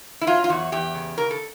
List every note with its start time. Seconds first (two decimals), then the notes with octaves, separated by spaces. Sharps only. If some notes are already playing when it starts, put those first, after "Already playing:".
0.21 E4
0.27 F#3 F4
0.44 F4
0.49 E2 F#4
0.72 E2 G4
0.95 C#3
1.18 C#3 A#4
1.31 A4